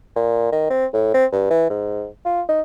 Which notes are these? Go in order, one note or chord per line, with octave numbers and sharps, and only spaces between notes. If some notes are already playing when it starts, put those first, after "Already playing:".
A#2
D#3
C4
A2
C4
G2
E3
G#2
F4
D#4